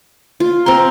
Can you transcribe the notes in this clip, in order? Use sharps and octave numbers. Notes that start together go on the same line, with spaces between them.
F4
C4 A#5 C6